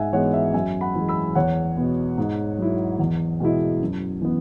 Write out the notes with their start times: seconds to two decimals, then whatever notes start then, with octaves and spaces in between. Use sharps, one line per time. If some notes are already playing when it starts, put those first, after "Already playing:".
Already playing: G#2 E5 F#5 G#5
0.13 E3 G#3 B3 C#5 F#5
0.33 E5
0.54 F#2 E5 G#5
0.81 F#5 B5
0.95 E3 G#3
1.08 B5 E6
1.35 E2 C#5 F#5
1.77 B2 B3
2.18 G#2
2.58 F#3 E4
2.99 E2
3.40 B2 G#3 B3 E4
3.82 F#2
4.22 E3 B3